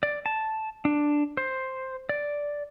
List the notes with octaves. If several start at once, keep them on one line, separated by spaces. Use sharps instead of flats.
D5
A5
D4
C5
D5